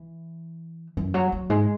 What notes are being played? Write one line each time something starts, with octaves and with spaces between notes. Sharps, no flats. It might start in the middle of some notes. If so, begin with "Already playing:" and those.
Already playing: E3
F#2 E3
F#3
F#3
G#2 G#3